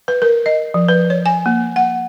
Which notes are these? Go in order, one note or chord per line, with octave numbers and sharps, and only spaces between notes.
B4
A#4
D#5
F3
B4
C#5
G#5
A#3
F#5